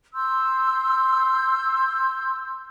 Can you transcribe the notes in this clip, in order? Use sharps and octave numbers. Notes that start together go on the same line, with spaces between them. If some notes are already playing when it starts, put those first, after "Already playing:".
C6 E6 G6